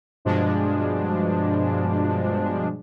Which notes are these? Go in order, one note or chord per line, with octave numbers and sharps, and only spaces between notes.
G2 B2 F3 G#3 D4